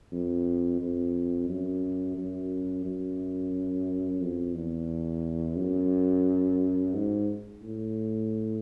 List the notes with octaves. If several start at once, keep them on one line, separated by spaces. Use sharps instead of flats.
F2
F2
F#2
F#2
F#2
F2
E2
F#2
G#2
A2